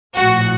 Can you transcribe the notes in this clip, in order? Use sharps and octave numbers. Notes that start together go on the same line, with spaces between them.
A#1 A2 F3 F#4 F#5